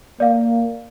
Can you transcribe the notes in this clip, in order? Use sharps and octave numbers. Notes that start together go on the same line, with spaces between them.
A#3 D5 F5